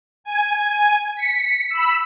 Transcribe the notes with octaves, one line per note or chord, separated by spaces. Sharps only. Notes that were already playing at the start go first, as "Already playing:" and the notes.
G#5
B6 C#7
B5 E6